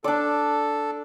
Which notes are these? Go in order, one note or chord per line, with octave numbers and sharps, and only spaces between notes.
D4 A4 D5